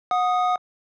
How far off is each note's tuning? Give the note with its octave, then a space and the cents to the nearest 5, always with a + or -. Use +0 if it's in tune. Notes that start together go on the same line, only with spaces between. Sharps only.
F#5 -25 D#6 +0